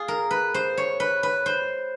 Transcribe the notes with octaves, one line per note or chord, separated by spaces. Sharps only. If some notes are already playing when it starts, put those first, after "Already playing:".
Already playing: F4 G#4
A#4
B4
C5
C#5
B4
B4
C5